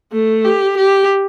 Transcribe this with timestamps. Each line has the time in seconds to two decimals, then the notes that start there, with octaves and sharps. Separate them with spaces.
0.12 A3
0.44 G4
0.77 G4